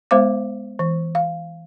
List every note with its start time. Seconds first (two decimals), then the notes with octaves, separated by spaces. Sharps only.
0.11 G#3 B3 C5 F5 D6
0.79 E3
1.15 F5